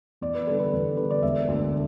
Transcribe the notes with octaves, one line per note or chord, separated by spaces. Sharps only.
E2 D5
B4
D3 G3 A4
B4
E2
D3 G3 B4
D5
E1 E5
D2 D3